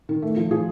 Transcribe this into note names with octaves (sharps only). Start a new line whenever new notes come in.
D#3
A3
F3
F3 G#4